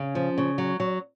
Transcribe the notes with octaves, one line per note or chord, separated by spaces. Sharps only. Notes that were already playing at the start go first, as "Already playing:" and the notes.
Already playing: C#3 C#4
F3
C#3
F#3
F#3